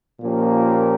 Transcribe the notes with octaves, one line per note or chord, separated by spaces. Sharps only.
A#2 F3 A#3 C#4 G4